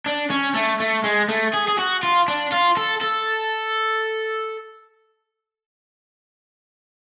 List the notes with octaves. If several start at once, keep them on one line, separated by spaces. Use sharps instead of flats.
D4
C#4
A3
A3
G#3
A3
G#4
G#4
F#4
F4
D4
F4
A4
A4